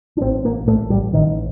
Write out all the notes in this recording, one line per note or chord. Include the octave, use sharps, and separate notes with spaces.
D4
A1 C4
A1 A#3
A1 A3
A1 G3
A1 D#3